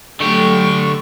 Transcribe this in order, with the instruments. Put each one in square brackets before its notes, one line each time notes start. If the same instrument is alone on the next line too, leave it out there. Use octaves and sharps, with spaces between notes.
[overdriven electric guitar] D3 G4 [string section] F#3 A3 [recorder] C#6